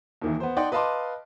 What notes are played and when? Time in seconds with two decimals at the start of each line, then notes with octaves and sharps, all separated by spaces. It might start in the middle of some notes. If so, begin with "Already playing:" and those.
0.22 D#2 D#3 E3
0.40 B3 C5
0.57 D#4 D5 F#5 G5 C6
0.72 B4 D#5 F5 A5 C6 D6